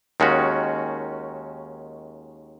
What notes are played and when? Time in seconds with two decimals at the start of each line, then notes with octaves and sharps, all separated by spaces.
0.20 D#2 D#3 G#3 C#4 F#4